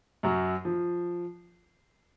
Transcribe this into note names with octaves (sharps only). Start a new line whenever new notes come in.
F#2 F#3
F3